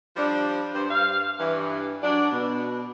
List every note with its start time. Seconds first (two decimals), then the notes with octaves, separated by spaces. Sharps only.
0.16 F3 G3 D4
0.73 G2 C5
0.89 G2 F5
1.39 G2 E3
2.03 F#3 D4
2.31 B2